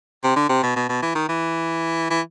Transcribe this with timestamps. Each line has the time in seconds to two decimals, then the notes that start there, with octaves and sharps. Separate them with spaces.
0.24 C3
0.36 D3
0.50 C3
0.63 B2
0.76 B2
0.89 B2
1.02 E3
1.15 D#3
1.29 E3
2.11 E3